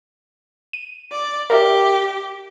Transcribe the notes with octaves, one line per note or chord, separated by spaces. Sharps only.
D#7
D5
G4 A#4 D5 E5